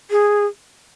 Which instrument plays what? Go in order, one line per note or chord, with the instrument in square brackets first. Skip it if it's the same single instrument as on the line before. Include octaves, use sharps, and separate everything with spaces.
[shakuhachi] G#4